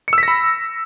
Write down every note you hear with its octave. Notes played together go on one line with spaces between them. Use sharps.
B5 E6 A#6 B6 C#7